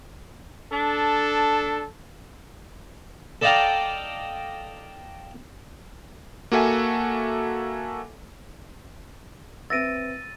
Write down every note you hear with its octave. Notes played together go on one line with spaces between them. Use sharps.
D4 A4
A4 D5 D#5 F5 G5 A#5
A#3 F#4 A4 E5 G#5
C4 B4 E5 E6 A6 A#6 D7 D#7